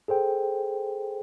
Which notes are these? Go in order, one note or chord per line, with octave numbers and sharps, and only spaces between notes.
G#4 A4 C5 G5